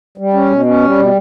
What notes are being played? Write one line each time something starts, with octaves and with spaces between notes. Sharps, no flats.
G3
C#4
B2
C#4
G3
B2